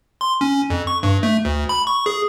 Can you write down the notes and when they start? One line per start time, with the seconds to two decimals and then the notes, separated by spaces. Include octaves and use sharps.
0.21 C6
0.41 C#4
0.70 F2
0.87 C#6
1.03 G2
1.23 A3
1.45 D2
1.69 B5
1.87 C#6
2.06 G#4